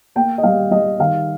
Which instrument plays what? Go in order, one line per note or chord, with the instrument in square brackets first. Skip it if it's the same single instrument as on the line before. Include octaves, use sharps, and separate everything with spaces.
[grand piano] A#3 G5
D#5
G3 F5
G3 D#5
D#3 F5